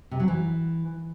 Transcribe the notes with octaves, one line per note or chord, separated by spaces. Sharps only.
C3
F#3
E3